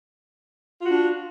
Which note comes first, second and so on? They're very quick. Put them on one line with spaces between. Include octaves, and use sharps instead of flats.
F4 F#4 D4